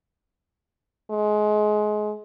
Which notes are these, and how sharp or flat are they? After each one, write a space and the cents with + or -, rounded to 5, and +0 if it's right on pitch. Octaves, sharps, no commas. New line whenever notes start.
G#3 +25